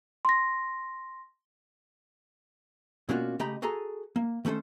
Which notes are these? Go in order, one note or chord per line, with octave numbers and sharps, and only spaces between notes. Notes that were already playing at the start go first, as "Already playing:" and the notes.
C6 A#6
B2 A#3 C#4 D4 F4 F#4
C#3 A3 G4 D#5 A#5 B5
F#4 G#4 A4 G#5 A#5
A#3
D#3 A3 C#4 A4 C5